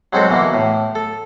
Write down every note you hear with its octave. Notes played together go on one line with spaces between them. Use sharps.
F#3 G#3 C4 F#4 A4 D#5
B2 E3 A#3
A2
A4